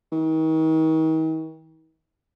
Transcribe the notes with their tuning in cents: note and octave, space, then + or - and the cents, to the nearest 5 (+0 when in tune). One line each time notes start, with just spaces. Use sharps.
D#3 +40